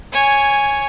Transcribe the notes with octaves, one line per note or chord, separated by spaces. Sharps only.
C#5 G#5